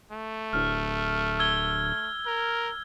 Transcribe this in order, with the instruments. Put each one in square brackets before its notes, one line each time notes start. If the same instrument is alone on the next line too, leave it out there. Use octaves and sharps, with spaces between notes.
[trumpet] A3
[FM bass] D1 [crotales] F6
[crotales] E6 G#6 G7
[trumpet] A#4